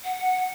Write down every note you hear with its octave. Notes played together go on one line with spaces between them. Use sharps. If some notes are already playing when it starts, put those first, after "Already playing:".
F#5